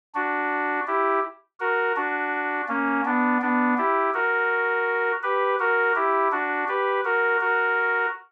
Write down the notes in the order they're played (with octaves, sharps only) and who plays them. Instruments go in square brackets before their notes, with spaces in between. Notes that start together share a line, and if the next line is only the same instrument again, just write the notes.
[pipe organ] D4 F#4
E4 G4
F#4 A#4
D4 F#4
A#3 C#4
B3 D4
B3 D4
E4 G4
F#4 A#4
G4 B4
F#4 A#4
E4 G4
D4 F#4
G4 B4
F#4 A#4
F#4 A#4